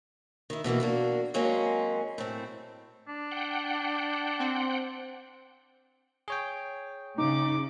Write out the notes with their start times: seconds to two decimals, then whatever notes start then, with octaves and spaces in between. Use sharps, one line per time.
0.50 D#3 E4
0.64 B2 E3 G3 A#3
0.80 A#3 D4 F#4
1.34 F#3 G#3 A#3 C4 C#4
2.18 A2 C4
3.08 D4
3.32 F#5 G5
4.40 C4
6.28 G#4 C#5 G5
7.18 C#3 D#4 D6